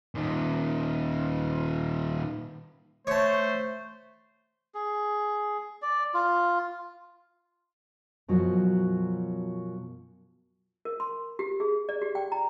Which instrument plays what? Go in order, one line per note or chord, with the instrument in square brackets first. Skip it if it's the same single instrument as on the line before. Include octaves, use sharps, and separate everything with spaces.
[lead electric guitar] A#2 D#3
[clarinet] A3 [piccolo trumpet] C5 [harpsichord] C#5 A5
[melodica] G#4
D5
F4
[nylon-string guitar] F#2 B2 F3 F#3
[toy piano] A#4
C6
G4
G#4
D5
G4
G5
A#5